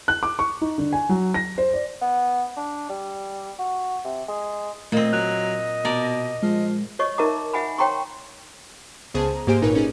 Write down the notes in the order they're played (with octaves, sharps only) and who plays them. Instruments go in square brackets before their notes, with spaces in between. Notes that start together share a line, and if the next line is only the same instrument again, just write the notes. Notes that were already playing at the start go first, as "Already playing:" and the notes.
[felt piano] F#6
D6
C#6
D#4
D3
G#5
F#3
A#6
C5
D5
[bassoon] B3
D4
G3
F#4
C3
G#3
[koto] A#2 C4 [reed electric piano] A3 [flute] D#5
[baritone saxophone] F#3 [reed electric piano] F#6
[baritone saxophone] B2 [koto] A#4 D5
[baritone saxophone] F3 [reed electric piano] G#3
[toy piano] C#5 D#5 C#6
D#4 A#4 E5 A#5 D6
E5 F#5 G#5 B5
C#5 G5 A#5 C6 C#6
[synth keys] C#2 C#3 B3 G#4 C5 A5
A#5 D#6
G#2 A#3 G4 C5 G#5 D7
G#1 A#2 D#4 A#4 B4 C#5
C#4 D#4 G#4 D5